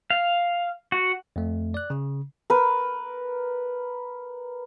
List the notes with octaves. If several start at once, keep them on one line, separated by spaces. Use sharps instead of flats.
F5
F#4
F2 A3
D5 F#6
C#3
A#4 B4